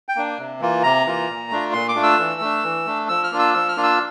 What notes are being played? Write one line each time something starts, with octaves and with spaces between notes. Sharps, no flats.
G5
A#3 D4
C3
E3 A#3 F4
C3 A#5
E3 A#3 F4
A#2
A3 D4 F4
A#2 C6
D6
A3 D4 F4
E6
E3
A3 D4
E3
A3 D4
F3 E6
F6
A#3 D4 F4
E6
F3 E6
F6
A#3 D4 F4
E6